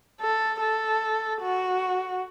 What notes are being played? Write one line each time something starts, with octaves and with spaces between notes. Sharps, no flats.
A4
A4
F#4